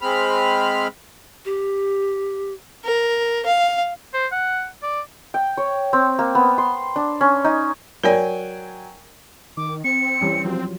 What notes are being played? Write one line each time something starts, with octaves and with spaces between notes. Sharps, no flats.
G#3 C4 B5 F6
G4
A#4
F5
C5
F#5
D5
G5
C#5
C4
A#3
B3
C6
D4
C#4
D#4
F#3 A#4 D5 G5 G#5
D#3 D6
C4 C#7
E3 G3 C#4
F3 F#3 F4